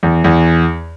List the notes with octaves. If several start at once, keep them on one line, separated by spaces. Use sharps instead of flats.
E2
E2